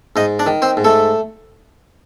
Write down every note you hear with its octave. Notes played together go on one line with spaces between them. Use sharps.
G#2 D#4 D#5
D4 D5
D#3
C4 C5
G#2
A3 A4